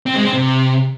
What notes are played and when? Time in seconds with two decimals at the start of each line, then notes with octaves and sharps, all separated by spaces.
0.06 C4
0.15 G#3
0.24 C4
0.33 C3